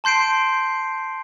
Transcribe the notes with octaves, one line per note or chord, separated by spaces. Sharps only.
A5 C6 G6 C7 D7